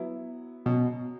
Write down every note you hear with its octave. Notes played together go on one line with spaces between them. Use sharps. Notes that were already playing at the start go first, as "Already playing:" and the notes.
Already playing: F#3 B3 E4
B2 F#3 C#4 F#4